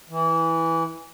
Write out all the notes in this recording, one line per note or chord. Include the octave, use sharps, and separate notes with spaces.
E3